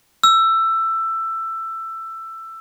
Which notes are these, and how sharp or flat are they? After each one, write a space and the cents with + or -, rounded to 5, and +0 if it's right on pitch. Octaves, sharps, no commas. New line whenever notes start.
E6 +15